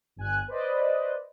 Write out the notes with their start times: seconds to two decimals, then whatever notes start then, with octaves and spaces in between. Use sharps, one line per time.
0.16 G1 G#5 F#6
0.48 B4 C5 D5 D#5